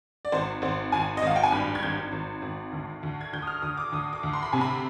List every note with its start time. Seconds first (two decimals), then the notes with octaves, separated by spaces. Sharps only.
0.25 D5
0.32 G#1 C5
0.62 G#1 C5
0.92 G#1 G#5
1.17 D#5
1.22 G#1 F5
1.36 G5
1.43 G#5
1.52 G2 B5
1.75 G#6
1.83 G#1 G6
2.12 G#1
2.42 G#1
2.73 D2
3.03 D2
3.21 G#6
3.33 D2 G6
3.42 D#6
3.47 F6
3.62 D2 D#6
3.77 D6
3.92 D2 D#6
4.13 D6
4.23 D2
4.33 C6
4.43 B5
4.53 C3 G#5
4.61 B5